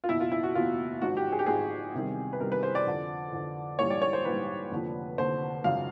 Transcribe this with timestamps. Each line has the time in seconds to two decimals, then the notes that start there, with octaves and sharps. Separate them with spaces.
0.04 F4
0.09 F#1 E2 B2 E4
0.20 F4
0.32 E4
0.43 F#4
0.55 F#1 E2 B2 F4
1.02 G#1 G#2 F3 F#4
1.17 G4
1.32 G#4
1.39 G4
1.46 G#1 G#2 F3 G#4
1.94 E2 C3 D#3 G3
2.33 B4
2.40 E2 C3 D#3 G3 A#4
2.52 B4
2.63 C5
2.75 D5
2.86 F2 D3 F3
3.33 F2 D3 F3
3.79 A#1 G#2 E3 G3 C#5
3.90 D5
4.02 C#5
4.13 C5
4.25 A#1 G#2 E3 G3 B4
4.71 F1 D#2 D3 F3
5.18 F1 D#2 D3 F3 C5
5.64 G#1 F#2 C#3 F3 F5